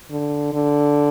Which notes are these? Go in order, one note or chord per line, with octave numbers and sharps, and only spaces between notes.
D3
D3